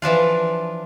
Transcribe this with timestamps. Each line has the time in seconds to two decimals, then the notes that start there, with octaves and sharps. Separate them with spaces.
0.02 E3 F3 D4 F4